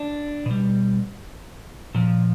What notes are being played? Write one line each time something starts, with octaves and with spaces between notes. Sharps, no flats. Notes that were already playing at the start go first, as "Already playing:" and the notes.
Already playing: D4
B2 G3
A#2 F3